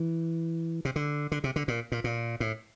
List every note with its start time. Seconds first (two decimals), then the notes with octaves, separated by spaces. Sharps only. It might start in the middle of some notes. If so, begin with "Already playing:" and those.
Already playing: E3
0.85 C3
0.96 D3
1.32 D3
1.44 C3
1.56 D3
1.68 A#2
1.92 A#2
2.04 A#2
2.40 A2